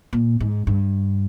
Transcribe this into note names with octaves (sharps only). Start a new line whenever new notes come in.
A#2
G#2
G2